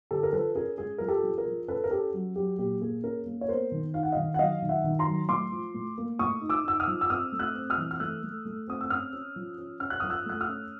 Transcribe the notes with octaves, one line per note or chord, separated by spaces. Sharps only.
D3 G4 A4
A#4
F3 A4 B4
C#4 G#4 A#4
G#3 G#4
F3 A#4
G4 A4
F3
G#4 A#4
F3
C#4 A4 B4
A#4
C#4 G4 A4
F#3
F#3 G4
A#2 G4
A#3 G#4
C#4 G#4 A#4
A#3
C#5
B3 A#4 C5
D#3
D#4 F5
F#5
D#3 D#5 F5
F#5
F#3 D#5 F5
D#3
E5 F#5
D#3
A#5 C6
F#3
A2 C6 D6
F3
A2
A#3
A2 C#6 D#6
D#4
D6 E6
D#4 E6
D#6 F6
F3
E6
C4 D#6 F6
A3
E6 F#6
C4
D#6 F6
E3
F6
A3 E6 F#6
A3
A3
C4 D#6
E6
C#4 D#6 F6
C#4
F3
C#4
C#4 F6
F#6
D#6 F6
F3
E6 F#6
A3 F#6
D#6 F6
C#4